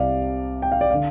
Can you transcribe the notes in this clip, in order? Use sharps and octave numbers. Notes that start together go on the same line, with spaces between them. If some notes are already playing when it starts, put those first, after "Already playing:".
Already playing: C2 C3 D5 F5
G5
F5
D5
D3 F5